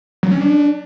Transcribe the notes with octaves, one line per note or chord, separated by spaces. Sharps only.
F#3
C#4
D4